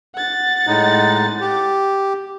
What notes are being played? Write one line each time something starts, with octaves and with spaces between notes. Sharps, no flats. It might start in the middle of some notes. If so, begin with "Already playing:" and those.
F#5 A6
A2 G#3 D#4
G4